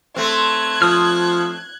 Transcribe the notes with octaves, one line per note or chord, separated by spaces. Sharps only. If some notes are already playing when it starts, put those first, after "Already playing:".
A3 C4 F#6 G#6
F3 D#6 F6